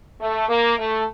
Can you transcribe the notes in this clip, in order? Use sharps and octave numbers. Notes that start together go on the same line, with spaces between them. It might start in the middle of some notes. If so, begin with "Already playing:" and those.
A3
A#3
A3